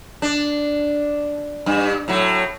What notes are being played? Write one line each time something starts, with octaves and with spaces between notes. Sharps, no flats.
D4
G2
A2 F#3